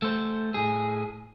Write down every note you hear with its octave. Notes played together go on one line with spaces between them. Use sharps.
A3 C5
A2 G#4